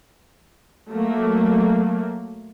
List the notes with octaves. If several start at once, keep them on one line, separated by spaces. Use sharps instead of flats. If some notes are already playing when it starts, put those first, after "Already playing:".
F#3 A3 A#3